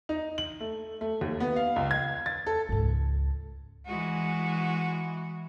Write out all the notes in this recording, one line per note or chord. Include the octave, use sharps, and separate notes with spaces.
D#4
F#7
A3
A3
D#2
B3
F5
C#2
G#6
A6
A4
C#2 G#2
E3 G#3 F#4